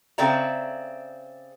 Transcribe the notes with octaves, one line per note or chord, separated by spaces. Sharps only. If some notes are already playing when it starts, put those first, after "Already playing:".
C#3 C4 A4 D5 E5 A#5